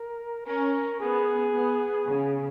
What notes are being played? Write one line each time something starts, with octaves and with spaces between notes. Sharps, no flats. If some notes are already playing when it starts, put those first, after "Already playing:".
Already playing: A#4
C#4 A#4
B3 G#4
B3
C#3